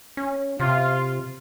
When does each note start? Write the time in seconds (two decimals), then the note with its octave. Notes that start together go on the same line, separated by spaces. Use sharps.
0.17 C#4
0.60 C3 F4